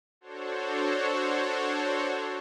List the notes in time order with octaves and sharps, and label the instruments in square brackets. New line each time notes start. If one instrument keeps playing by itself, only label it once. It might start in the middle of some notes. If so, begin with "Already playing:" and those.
[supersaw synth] D4 F#4 A4 C5 C#5